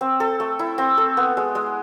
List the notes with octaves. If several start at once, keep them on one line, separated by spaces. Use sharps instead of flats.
C4
A4
A3
E4
C4
A4
B3
G#3
G#3